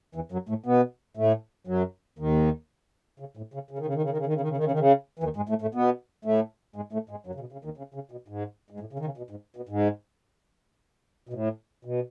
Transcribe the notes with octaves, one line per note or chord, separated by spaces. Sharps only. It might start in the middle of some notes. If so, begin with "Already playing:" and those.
E2 E3
F#2 F#3
A2 A3
B2 B3
A2 A3
F#2 F#3
D#2 D#3
C#3
A2
C#3
C#3
D#3
C#3
D#3
C#3
D#3
C#3
D#3
C#3
D#3
C#3
D#3
C#3
D#3
C#3
E3
D#2 D#3
G#2 G#3
A2 A3
A2 A3
B2 B3
A2 A3
G#2 G#3
A2 A3
G#2 G#3
F#2 F#3
C#3
B2
C#3
D#2 D#3
C#3
C#3
B2
G#2
G#2
A2
C#3
D#3
C#3
B2
G#2
B2
G#2
B2
A2
B2